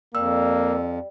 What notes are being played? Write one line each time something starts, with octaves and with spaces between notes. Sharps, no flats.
F2 G3 A#3 E6